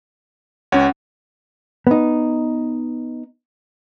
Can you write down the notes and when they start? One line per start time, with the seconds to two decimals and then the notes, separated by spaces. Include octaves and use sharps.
0.72 C#2 C#4 C#5 F#5
1.87 B3 D#4